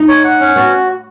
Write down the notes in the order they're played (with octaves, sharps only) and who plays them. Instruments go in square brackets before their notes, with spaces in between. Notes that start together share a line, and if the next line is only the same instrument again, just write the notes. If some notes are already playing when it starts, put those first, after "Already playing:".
Already playing: [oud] D#4
[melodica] C#5
F#5
C#4
[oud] B3 [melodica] F#4